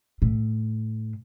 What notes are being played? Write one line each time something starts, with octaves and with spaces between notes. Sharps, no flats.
A2